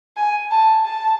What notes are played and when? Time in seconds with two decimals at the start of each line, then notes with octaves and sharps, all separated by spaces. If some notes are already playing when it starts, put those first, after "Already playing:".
0.17 G#5
0.51 A5
0.85 A5